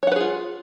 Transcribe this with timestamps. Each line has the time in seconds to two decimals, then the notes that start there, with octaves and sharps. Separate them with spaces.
0.03 C#5
0.07 F#5
0.12 B4
0.16 G#4
0.20 F4